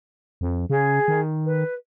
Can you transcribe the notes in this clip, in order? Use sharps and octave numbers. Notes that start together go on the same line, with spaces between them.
F2
C#3 G#4
D#3
B4